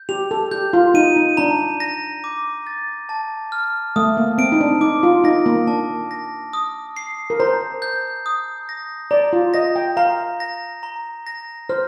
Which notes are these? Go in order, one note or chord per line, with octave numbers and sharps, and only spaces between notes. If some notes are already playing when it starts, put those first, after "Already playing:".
Already playing: G6
G4 F7
A4
G4 G6
F4
D#4 D#7
D#4
D4 A#5
A#6
D6
A6
A5
F6
A3 D#6
A#3
C4 D7
D#4
D4
D#4 D6
F4
D#4 A#6
A#3
D4 A5
A#6
D#6
C7
A#4
C5 A#5
G6
D#6
A#6
D5 A#5
F4
D#5 A#6
G5
F5 A#5
A#6
A#5
A#6
C5 F6